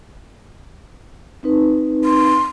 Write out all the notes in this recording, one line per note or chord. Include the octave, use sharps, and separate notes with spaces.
C4 D#4 B4
C6